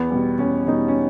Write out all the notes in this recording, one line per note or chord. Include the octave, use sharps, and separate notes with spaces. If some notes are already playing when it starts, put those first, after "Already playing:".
Already playing: E2 B3
B2 G3
E2 C#4
B2 G3 D#4
C#4